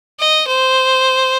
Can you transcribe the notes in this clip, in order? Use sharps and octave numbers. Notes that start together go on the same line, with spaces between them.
D#5
C5